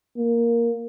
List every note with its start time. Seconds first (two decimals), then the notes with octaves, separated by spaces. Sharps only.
0.18 A#3